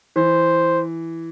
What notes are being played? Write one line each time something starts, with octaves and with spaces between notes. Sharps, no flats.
E3 C5